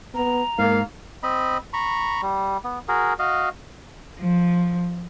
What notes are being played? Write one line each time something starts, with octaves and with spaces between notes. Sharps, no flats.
B3 A#5
G#2 A#3 F5
C4 D#5 B5
A#5 B5 C#6
G3
B3
F#4 G#4 A#4
F#4 D#5 F5
F3